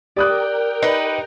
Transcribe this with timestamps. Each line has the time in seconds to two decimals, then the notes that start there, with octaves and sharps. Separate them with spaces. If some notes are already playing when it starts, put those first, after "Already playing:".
0.16 G4 A#4 D5 G5 D#6 F#6
0.83 D#4 B4